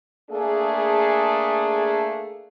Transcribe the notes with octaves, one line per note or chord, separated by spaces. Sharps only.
A3 A#3 D4 G#4